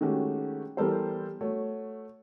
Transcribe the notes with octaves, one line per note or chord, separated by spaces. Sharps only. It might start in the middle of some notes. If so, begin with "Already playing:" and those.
D#3 G#3 A3 C#4 F#4 G4
E3 G3 B3 A4 A#4 C5
A3 F#4 C#5